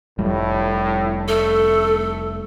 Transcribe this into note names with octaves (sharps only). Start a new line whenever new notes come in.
F1 A2 G3
A3 A4